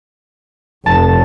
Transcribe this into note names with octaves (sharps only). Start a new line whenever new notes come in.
F1 A5